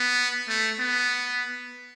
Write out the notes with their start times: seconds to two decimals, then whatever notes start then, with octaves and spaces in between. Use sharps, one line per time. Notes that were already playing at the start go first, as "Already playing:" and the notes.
Already playing: B3
0.48 A3
0.79 B3